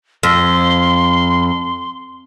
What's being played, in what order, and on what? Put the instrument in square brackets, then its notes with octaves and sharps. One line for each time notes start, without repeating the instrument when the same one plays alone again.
[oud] F2 [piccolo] C6